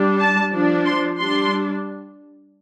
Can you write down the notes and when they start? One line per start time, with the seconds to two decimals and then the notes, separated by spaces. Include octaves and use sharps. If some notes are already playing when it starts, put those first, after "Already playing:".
Already playing: G3 D4
0.19 A5
0.52 F3 D4
0.85 C6
1.18 G3 D4 C6